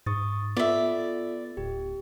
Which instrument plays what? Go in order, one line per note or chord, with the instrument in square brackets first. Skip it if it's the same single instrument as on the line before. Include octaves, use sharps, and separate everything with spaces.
[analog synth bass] G#2 [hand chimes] C#6 D#6 A6
[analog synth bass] B3 [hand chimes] F4 A4 [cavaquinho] D5 E5
[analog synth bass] D1 [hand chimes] G4